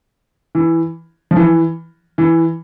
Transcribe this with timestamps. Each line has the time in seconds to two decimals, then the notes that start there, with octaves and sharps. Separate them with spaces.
0.55 E3
1.31 F3
1.36 E3
2.18 E3